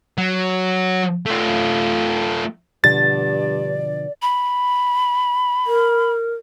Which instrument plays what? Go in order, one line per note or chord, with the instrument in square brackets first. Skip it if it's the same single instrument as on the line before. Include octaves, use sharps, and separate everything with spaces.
[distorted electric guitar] F#3
A3 F4
[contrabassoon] G2 [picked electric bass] B2 D3 F3 [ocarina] D5 [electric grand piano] A6
[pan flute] B5
[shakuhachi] A#4